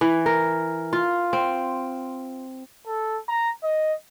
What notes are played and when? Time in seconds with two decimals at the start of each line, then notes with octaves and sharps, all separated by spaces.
0.01 E3
0.26 A#4
0.93 F4
1.33 C4
2.86 A4
3.28 A#5
3.63 D#5